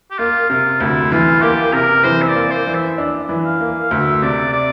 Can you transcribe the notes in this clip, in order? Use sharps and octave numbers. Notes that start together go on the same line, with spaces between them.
G4
A#3 F4
C3 F4
D2 E4
E3 F4
A#3 G4
C3 A#4
E3 C5
E5
D5
A#3
C5
E3
E5
D4
E3
F5
A#3
D2 E5
C3 D5
D5